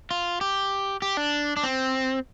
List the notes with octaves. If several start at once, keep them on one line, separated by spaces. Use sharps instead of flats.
F4
G4
G4
D4
D4
C4